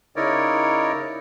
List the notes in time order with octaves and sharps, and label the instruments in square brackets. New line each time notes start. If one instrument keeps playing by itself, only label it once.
[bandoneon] C#3 D#4 E4 A#4 C#5 D5